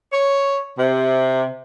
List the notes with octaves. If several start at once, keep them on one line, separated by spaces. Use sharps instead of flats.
C#5
C3